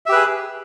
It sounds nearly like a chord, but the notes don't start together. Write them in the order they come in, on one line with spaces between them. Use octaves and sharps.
E5 G4 B4 G#4